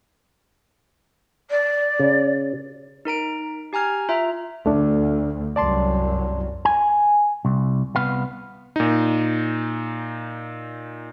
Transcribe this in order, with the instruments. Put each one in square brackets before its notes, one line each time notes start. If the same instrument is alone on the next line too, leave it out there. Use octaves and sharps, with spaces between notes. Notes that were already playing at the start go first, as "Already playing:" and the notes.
[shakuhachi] D5
[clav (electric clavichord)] C#3
[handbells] D#4 A#4 A#5 D7
G4 G#5 A#5 F6 G#6
F4 E5 A#5
[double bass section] D2 [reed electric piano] A3 D4
[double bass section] C2 F#2 F#3 [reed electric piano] D5 A5 C6
[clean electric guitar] G#5
C2
C2 B3 F5
[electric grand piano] A#2 D#4